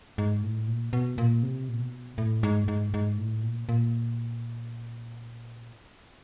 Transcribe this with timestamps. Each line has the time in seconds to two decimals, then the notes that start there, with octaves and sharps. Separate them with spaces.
0.18 G#2
0.43 A2
0.67 A#2
0.93 B2
1.18 A#2
1.43 C3
1.69 A#2
1.80 B2
2.18 A2
2.43 G#2
2.68 G#2
2.94 G#2
3.18 A2
3.43 A#2
3.69 A#2